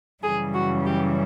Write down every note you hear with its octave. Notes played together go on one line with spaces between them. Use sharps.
F#2 C#3 E3 G3 G#4
F#4
G4